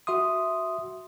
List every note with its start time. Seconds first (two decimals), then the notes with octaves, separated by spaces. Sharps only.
0.07 F#4 E5 C6 D#6